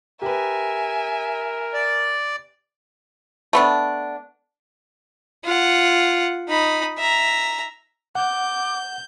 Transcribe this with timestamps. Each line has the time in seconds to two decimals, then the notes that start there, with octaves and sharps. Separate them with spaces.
0.22 G4 A#4 B4 E5 G#5
1.74 D5
3.53 A3 B3 D4
5.44 F4 F#5
6.48 D#4 B5
6.98 E5 A#5
8.15 F#5 D6 G6